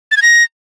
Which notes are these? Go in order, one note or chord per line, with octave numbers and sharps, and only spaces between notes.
A6
G#6
A#6